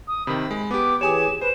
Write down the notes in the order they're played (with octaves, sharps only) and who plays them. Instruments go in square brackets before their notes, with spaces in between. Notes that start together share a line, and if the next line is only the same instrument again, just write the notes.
[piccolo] D#6
[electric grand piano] C3 D#3 [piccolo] B5
[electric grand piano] G#3
[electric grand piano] B3 G4 [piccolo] D6
[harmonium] E3 G4 G#4 [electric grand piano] C#5 G#5 D#6 [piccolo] E7
[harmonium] B4 [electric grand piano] C5 [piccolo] E7